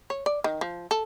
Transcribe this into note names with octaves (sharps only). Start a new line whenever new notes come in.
C#5
D5
D#3
F3
A4